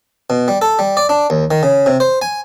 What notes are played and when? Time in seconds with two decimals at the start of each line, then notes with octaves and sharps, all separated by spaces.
0.30 B2
0.48 G3
0.62 A4
0.79 G3
0.97 D5
1.09 D4
1.30 D#2
1.51 D#3
1.63 C#3
1.86 C3
2.00 C5
2.22 G#5